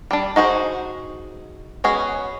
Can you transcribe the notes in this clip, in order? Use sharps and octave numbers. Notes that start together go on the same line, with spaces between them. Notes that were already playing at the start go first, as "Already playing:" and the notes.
G3 D4
D#4 F#4 G#4 C5
G#3 B3 C#4 F#4 G#4